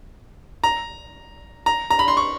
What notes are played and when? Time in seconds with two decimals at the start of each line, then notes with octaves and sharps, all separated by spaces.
0.64 A#5
1.66 A#5
1.90 A#5
1.99 B5
2.08 C6
2.17 C#6